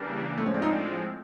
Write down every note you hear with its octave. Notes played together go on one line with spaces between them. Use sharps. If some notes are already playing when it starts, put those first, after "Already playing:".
Already playing: C#3 E3 G3 A#3 D4
A2 F3 G#3 A3 C4
C#4
D4
D#4
D4